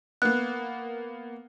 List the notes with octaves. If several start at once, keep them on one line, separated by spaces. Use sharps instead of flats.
A#3 B3 F#6